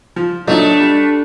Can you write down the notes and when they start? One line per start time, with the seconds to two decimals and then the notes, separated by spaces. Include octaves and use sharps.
0.16 F3
0.47 A#2 F#3 A3 D4 D#4
0.80 G3